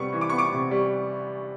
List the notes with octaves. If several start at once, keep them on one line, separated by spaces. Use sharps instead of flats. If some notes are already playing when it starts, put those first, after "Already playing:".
Already playing: C3 G3 B3 C#6
E3
D6
B3 C#6
D6
C3
G3